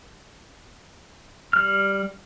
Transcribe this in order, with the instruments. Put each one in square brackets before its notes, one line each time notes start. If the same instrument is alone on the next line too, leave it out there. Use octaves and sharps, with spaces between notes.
[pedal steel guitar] G3 F6